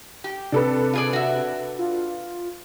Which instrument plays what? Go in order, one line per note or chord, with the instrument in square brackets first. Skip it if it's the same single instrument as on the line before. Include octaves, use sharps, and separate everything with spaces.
[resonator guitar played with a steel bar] G4
[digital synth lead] C3 [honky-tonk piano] D4 A4 B4
[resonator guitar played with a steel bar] F4 G#4 D5
F#4 E5
[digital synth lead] F4